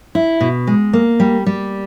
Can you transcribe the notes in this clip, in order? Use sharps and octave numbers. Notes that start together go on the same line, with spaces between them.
E4
B2
G#3
A#3
G3
G3